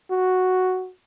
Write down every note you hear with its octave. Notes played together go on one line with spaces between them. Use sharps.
F#4